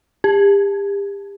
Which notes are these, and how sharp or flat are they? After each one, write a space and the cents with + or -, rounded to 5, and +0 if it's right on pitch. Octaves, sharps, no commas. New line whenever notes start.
G4 +35